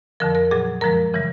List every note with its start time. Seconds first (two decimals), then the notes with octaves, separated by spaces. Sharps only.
0.20 F2 D3 F3 A#4
0.35 A#4
0.51 A#2 F#3 G#4
0.81 F#2 D3 F3 G#3 A#4
1.14 C#3 E3 G3